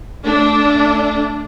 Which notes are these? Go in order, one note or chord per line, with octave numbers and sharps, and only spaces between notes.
A3 D4